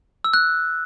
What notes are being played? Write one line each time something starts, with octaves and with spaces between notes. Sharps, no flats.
E6
F#6